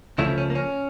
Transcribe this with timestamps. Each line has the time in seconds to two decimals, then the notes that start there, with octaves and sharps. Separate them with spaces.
0.18 C#2 C#3 F3 A3 E4
0.38 C#4
0.50 A#3
0.55 C#4